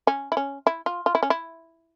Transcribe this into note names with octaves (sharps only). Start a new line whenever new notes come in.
C#4
E4
C#4
E4
F4
F4
E4
C#4
E4